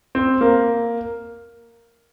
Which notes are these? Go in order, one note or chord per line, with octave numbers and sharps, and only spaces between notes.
C4
A#3